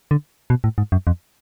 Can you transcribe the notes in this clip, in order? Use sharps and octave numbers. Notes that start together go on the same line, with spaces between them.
D3
B2
A2
G#2
F#2
F2